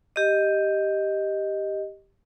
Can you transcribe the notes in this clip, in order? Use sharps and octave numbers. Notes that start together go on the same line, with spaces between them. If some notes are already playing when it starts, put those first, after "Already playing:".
G4 D#5